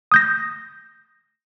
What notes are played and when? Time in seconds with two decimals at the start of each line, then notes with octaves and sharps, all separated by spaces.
0.12 D#6 G6 A#6